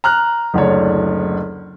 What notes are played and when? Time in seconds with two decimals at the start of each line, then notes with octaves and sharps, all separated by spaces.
0.04 A#5 F6 F#6
0.54 F#1 D2 D4 C#5